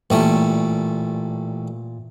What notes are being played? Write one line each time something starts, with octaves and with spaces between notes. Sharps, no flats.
A1 A#2 G3 A3